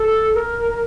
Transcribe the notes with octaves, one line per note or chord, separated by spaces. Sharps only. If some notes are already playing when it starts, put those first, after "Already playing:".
Already playing: A4
A#4